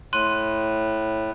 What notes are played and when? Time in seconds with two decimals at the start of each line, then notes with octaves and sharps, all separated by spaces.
0.13 A2 C6 F#6 D#7